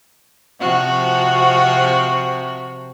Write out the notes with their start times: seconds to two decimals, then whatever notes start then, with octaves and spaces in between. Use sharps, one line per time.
0.60 C3 F3 F#4